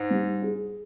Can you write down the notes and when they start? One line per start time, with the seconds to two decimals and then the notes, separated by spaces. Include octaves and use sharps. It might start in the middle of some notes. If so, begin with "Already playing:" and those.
Already playing: G#2
0.10 G3
0.42 G#4